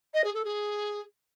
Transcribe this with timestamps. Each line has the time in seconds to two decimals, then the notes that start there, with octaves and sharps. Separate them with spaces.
0.13 D#5
0.23 G#4
0.34 A4
0.44 G#4